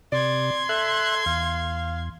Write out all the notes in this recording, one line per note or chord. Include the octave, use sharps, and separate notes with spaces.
C3 D5 C6 G#6
A4 E5 F#6
E2 F5